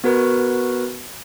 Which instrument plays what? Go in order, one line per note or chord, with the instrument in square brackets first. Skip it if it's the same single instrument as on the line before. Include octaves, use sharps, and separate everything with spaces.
[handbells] B3 F#4 A#4 B4